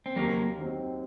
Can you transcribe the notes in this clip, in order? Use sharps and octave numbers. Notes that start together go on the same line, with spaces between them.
C4
D#2 F#3 A#3
D#3 F#3 C4